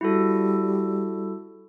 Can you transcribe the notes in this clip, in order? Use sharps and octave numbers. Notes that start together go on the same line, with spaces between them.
G3 E4 F#4 A4